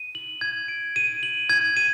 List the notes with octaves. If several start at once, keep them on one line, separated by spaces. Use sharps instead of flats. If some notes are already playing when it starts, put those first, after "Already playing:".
Already playing: D#7
F#7
G#6
D7
D#7
F#7
G#6
D#7